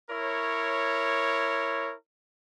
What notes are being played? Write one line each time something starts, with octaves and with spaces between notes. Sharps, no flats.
E4 A#4 C#5